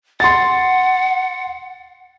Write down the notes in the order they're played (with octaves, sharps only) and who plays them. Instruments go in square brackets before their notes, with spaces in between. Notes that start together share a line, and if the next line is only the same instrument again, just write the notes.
[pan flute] F#5 [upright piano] C6 A6